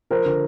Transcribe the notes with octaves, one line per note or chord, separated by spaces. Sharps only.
F3 A#4 C5
D3